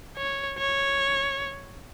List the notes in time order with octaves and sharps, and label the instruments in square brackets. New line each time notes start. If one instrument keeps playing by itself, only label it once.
[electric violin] C#5
C#5